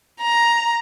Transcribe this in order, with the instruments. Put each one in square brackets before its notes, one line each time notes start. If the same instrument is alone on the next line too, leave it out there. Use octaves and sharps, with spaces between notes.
[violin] A#5